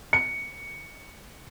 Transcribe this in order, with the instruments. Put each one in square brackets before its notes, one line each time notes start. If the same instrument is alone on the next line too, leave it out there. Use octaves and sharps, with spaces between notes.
[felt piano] C#7